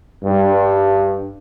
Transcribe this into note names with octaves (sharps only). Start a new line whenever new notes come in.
G2